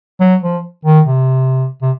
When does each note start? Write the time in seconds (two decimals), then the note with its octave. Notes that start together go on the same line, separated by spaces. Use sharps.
0.21 F#3
0.43 F3
0.86 D#3
1.06 C3
1.82 C3